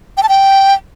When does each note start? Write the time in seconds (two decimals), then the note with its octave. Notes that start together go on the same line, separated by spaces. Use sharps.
0.17 G5
0.23 A5
0.29 G5